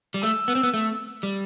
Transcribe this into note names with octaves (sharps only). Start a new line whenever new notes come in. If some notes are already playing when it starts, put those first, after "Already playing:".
G3
A3 E6
B3
C4
B3
A3
G3